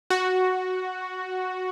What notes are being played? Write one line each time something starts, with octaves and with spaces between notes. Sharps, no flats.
F#4